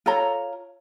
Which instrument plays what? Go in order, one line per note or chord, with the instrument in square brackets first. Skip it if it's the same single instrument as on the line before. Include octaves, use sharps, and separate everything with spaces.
[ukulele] F4 A4 C#5 A#5